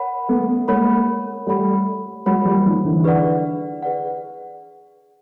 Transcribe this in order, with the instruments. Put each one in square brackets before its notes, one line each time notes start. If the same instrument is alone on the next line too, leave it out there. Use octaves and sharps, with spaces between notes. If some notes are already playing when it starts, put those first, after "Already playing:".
Already playing: [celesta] A#4 C#5 F#5 B5
[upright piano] A3 B3
[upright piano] G#3 A#3 [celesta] A#4 C#5 F#5 B5
[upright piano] G3 A3 [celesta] A#4 C#5 F#5 B5
[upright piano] F#3 G#3 [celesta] A#4 C#5 F#5 B5
[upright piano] F3 G3
D#3 F3
D3 E3
[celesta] G#4 B4 D5 F#5
G#4 B4 D5 F#5